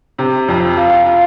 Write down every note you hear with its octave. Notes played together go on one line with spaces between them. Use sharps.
C3
F2
F4
F4